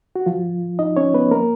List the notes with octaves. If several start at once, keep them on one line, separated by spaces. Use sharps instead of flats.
F#4
F3 F4
D#4 D#5
C#4 C#5
B3 B4
A#3 A#4